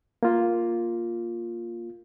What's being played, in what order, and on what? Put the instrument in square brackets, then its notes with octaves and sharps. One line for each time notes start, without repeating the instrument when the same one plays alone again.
[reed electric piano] A#3 F4